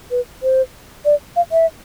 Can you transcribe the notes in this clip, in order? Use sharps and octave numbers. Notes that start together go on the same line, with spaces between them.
B4
C5
D5
F5
E5